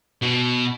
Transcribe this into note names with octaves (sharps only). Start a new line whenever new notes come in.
B2